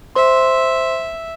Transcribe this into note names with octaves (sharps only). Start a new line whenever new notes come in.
C5 E5 C6